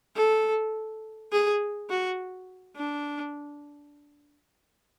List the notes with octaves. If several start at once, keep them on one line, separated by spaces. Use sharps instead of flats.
A4
G#4
F#4
D4